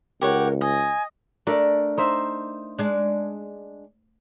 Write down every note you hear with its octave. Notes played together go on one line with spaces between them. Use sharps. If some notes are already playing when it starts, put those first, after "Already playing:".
C#2 G4 A#4 C#5 F#5
D#5 G#5
A3 D4 A4 A#4
D#4 C5 E5
G#3 D4